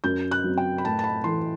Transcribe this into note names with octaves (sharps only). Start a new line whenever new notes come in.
F#2 G6
F#6
F#3 C4
G5
B5
A2 A5
A5
B5
E3 A3 C6